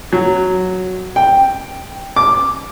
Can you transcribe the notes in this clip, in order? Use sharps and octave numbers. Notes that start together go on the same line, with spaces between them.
F#3
G5
D6